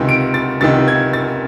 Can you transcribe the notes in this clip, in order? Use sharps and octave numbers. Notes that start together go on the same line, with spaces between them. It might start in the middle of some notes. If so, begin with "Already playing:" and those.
Already playing: C#2 C3 D#3
D7
A6
C#2 C3 D#3 A6
G#6
A6